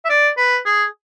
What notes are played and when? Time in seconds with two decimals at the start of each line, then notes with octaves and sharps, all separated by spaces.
0.05 E5
0.10 D5
0.37 B4
0.65 G#4